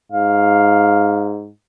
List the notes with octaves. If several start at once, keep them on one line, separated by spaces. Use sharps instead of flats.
G#2 F5